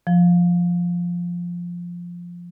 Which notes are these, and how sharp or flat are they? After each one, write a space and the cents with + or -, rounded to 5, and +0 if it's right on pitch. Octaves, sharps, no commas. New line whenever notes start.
F3 +0